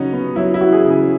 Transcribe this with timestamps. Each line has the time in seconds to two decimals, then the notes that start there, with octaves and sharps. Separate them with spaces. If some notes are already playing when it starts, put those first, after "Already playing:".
Already playing: C#3 F#3 C#4 D#4 F#4
0.13 B3
0.36 F#3 E4
0.54 E4
0.61 F#4
0.73 G#4
0.84 C#3
0.90 G#4